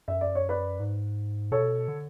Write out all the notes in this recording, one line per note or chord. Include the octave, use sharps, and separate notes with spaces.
F#2 E5
D5
C#5
B4 D5
G#2
B2 A4 C#5
D3